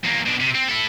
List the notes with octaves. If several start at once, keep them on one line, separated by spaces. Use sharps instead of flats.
E2 A#3
B2 D4
C3
C4
E4 A4